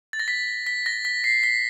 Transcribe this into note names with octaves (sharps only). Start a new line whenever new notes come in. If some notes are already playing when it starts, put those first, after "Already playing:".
A6
A#6
B6
B6
A#6
B6
C7
B6